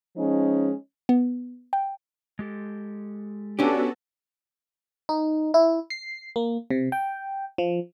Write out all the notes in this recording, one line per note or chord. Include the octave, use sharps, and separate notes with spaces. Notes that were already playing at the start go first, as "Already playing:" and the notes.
F3 G#3 C#4 D#4
B3
G5
G#3 G4 A4
B3 C#4 D4 F#4 G4 A4
D#4
E4
C7
A#3
C3
G5
F3